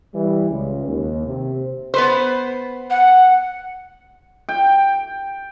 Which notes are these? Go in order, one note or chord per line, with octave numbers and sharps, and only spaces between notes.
E3 G3
C#2
D#2
C3
B3 B4 C5
F#5
G5